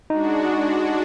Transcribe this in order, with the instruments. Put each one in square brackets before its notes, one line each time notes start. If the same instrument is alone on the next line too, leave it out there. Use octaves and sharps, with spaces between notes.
[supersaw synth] G#3 D4 F#4 [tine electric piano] D#4